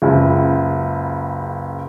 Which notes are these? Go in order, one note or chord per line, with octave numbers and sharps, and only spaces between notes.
F#1 C#2